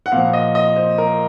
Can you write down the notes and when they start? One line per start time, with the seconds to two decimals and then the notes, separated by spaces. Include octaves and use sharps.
0.06 F#5
0.12 A#2 F3 F5
0.33 D#5
0.55 D#5
0.76 C5
0.98 A#4